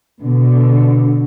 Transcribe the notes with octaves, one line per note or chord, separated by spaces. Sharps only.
B2 D3